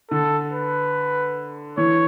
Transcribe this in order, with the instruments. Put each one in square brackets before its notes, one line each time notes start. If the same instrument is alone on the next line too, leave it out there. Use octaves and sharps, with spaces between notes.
[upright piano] D3 [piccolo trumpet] A4
[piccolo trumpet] B4
[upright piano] E3 [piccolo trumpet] C#5